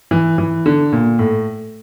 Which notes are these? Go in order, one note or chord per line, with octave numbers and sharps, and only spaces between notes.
E3
E3
D3
A#2
A2